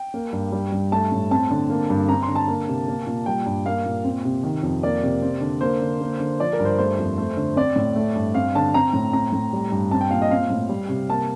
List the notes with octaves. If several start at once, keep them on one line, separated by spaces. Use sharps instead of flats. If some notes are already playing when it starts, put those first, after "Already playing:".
Already playing: G5
A#3
G2
G3
G2
A3 A5
A2
C4 A5
D3
A#3
G2
C4 A#5
C6
D3
A5
A#3
C3
A#3
A#2
G3 G5
G2
A#3 F5
A#2
C4
C3
D#3
F2
A#3 D5
C3
C4
D3
A#3 C5
D3
A#3
D3
F3 D5
A#4
G2
C5
A3 C5
F2
A3
D3
C4 D5
A2
A3
G2
C4 F5
D3 A5
C4 A#5
A2
C4 A#5
A2
G3
G2
C4 A5
G5
A#2 F5
D#5
C4 F5
A2
G3
C3
A#3 A5